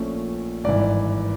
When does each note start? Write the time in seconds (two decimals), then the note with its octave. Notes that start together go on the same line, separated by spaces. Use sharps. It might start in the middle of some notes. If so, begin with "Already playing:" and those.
Already playing: A#1 A#2 F3 A3 C#4
0.64 G#1 G2 E3 D5